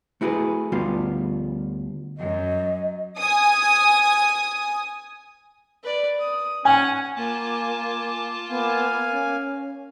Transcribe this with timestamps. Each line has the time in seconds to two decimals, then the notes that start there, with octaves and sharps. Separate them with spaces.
0.21 A3 E4 F#4 G#4 B4
0.72 D2 G3 B3 F4
2.18 F#2 D#5
3.18 G#5 D#6
5.83 B4 D5
6.20 D#6
6.65 C#4 F#5 G#5
7.16 A#3 F4 G#5 A5 D6
8.49 A#3 B3 F5 G#5
9.11 C#4